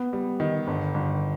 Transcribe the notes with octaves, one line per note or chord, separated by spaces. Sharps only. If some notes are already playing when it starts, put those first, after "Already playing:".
Already playing: B3
G3
D#3
G1
G1